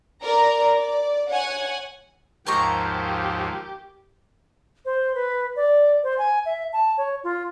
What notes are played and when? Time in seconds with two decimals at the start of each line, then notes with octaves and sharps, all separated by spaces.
0.23 A#4 D5 A#5
0.75 D5
1.30 C#5 F#5 G#5
2.47 D#2 G#2 F3 A#3 G4 A#5 C#6
4.85 C5
5.15 B4
5.56 D5
6.03 C5
6.18 G#5
6.46 E5
6.73 A5
6.98 C#5
7.24 F4